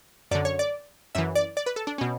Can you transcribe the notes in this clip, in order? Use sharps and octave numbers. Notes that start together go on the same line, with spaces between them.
F#2 D3 D5
C#5
D5
F#2 E3 E5
D5
D5
B4
A4
D4
B2 C#4